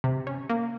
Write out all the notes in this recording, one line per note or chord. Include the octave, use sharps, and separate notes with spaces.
C3
C#4
A#3